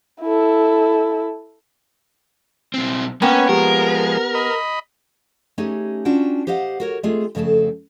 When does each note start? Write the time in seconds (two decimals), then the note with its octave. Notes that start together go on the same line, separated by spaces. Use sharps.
0.22 E4 A4
2.74 B1 C4
3.22 A#3 B3 C#4 B4 C#5 G5 G#5
3.49 F3 G#3 G4 A#4
4.35 D#5 B5
5.58 A3 C#4 D#4 G4 G#4
6.05 C#4 D4 F4 F#4 G5 A5
6.47 G4 C5 D#5 F5 F#5
6.80 F#4 A#4 C#5
7.03 G#3 A3 C4 F4 G#4
7.35 F2 C#3 A3 C4 A4